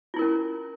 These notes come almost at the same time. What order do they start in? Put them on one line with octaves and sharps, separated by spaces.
F4 E4 A#4 C#4